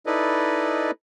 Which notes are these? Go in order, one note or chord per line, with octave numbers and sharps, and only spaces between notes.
D#4 E4 A4 B4 D5 D#5